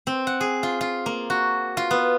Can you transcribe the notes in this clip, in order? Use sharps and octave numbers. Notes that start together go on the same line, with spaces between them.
C4
F#5
G#4
F4
F4
A#3
F#4
F4
B3